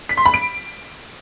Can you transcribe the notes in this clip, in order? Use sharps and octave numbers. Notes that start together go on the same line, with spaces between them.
B6
C6
B5
D7